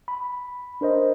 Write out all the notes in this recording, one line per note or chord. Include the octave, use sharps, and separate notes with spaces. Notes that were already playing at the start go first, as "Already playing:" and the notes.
B5
D4 A#4 C5 D#5